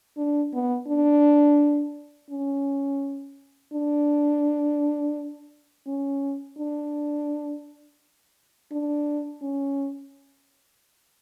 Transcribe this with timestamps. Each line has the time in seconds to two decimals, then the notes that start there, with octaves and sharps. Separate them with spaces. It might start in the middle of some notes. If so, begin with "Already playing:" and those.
0.17 D4
0.53 B3
0.88 D4
2.31 C#4
3.73 D4
5.87 C#4
6.58 D4
8.72 D4
9.42 C#4